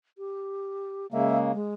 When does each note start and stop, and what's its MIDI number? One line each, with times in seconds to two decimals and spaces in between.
0.18 1.07 67
1.12 1.52 49
1.12 1.52 56
1.12 1.52 58
1.12 1.37 76
1.53 1.74 56